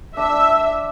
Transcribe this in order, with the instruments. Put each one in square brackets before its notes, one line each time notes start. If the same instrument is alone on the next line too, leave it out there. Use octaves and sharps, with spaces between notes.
[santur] D4 [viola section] E5